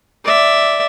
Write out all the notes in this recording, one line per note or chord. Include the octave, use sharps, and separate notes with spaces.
D5 E5